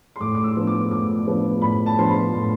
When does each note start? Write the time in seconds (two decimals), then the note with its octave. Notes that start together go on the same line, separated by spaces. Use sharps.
0.16 C6
0.20 A2 D6
0.35 D6
0.44 E6
0.56 F3 B3 D4
0.67 D6
0.91 A2 D6
1.27 F3 B3 D4
1.62 A2 B5
1.86 A5
1.97 F3 B3 D4 C6
2.09 B5
2.33 A2